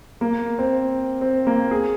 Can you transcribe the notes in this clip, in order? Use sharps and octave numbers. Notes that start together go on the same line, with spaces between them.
A#3
C4
C4
A#3
G#4